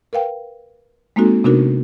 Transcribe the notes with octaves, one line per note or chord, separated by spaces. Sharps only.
A#4 B4 F5 G5
G#3 A#3 C4 D#4 F#4 A4
C3 B3 D4 D#4 F#4 A#4